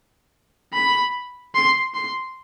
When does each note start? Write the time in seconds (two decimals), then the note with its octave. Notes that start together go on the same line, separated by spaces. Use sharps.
0.74 B5
1.55 C6
1.95 C6